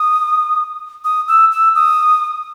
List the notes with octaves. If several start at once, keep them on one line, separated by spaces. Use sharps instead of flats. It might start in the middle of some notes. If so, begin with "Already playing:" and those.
Already playing: D#6
D#6
E6
E6
D#6